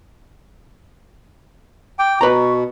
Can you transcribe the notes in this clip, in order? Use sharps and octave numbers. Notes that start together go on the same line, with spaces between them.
G5 D6
B2 B4 A#5 C#6